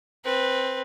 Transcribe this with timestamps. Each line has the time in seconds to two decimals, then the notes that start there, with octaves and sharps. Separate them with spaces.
0.24 C4 B4